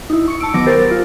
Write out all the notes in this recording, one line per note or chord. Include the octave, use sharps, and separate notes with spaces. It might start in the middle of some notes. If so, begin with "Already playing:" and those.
D#4 E4
C#6 C#7
A5 E6 D7
D#3 F#3 B3 D6 A#6 D7
G4 A#4 C5 A6
F4